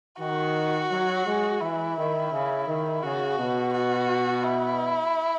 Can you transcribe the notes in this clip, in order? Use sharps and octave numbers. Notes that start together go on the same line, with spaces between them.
D#3 F#4
F#3
G#3
E3 E4
D#3
C#3
D#3
C#3 F#4
B2
F#4
E4